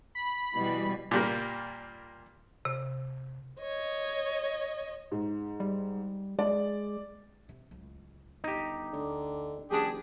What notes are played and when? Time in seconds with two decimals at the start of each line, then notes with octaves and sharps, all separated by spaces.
0.15 B5
0.56 B2 E3 G3
1.11 A#2 G3 A#3
2.65 C3
3.61 C#5 D#5
5.12 G#2
5.60 G3
6.39 G#3 D5
7.49 C3
7.71 D1 C#2
8.44 G1 D#4 G4
8.93 D2 D3 B3
9.71 F#1 E3 D4 G4 G#4